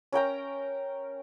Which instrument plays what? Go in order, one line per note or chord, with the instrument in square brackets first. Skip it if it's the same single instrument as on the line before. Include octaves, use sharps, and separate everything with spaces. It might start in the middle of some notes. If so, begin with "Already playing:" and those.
[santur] C#4 A#4 G5 A#5